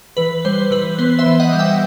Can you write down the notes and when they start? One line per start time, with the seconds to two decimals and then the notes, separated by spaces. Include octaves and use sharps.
0.17 E3 B4
0.45 G3 C5
0.71 E3 B4
0.99 B3 C5
1.19 C5 E5
1.26 E3
1.40 D#5 F#5
1.53 G3
1.59 E5 G5